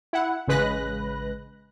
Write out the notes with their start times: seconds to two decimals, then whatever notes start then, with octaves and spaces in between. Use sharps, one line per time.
0.13 E4 F#5
0.47 A1 C#3 G#3 B4 F#6 A#6